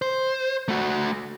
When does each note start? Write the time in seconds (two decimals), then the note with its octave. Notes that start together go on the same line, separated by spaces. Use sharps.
0.02 C5
0.68 A3 F#4